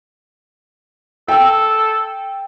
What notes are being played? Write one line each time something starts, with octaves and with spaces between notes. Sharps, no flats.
A4 G5 E6